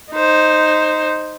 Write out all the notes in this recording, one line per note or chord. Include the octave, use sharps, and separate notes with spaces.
D#4 C5